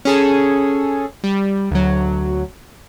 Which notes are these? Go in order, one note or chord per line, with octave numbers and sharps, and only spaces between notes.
C#4 G#4 A4
G3
D2 F#3